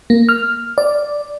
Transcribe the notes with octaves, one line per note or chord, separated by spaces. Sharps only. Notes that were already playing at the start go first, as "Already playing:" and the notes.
A#3
F6
D5